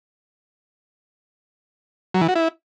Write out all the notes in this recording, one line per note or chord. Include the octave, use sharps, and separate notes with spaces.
F#3
E3
F#4
E4